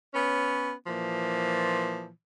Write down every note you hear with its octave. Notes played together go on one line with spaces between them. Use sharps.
B3 C#4
A#2 E3 F3